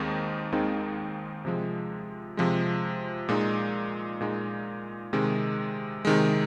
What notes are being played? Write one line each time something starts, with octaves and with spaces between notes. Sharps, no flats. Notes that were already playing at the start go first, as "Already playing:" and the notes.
Already playing: D#2 D#3 G#3 C4 D#4
D#2 D#3 G#3 C4 D#4
C3 F3 G#3
C3 F3 G#3
A#2 G#3 D#4
A#2 G#3 D#4
C3 D#3 G#3
C3 D#3 G#3